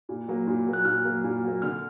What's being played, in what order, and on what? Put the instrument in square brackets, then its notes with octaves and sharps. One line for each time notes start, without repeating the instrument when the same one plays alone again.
[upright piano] A#2
F#3 A#3
A#2
F#3 A#3
[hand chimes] F#6
[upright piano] A#2 [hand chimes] F6
[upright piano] F#3 A#3
A#2
F#3 A#3
[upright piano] D3 [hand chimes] F6